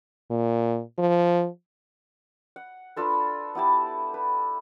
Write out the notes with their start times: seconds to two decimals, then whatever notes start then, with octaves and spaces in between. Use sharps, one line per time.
0.31 A#2
0.98 F3
2.56 F#5
2.96 D4 F4 A4 B4
3.55 B3 E4 G4 A5
4.14 B4